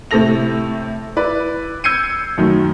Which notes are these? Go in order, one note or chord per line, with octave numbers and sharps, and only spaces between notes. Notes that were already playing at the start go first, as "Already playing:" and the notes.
A2 C3 A3 A4 A#6 F7
E4 B4 D5
E6 G6 G#6 C7 C#7 D#7
F#2 D#3 F#3 A3